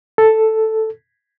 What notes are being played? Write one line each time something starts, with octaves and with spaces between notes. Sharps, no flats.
A4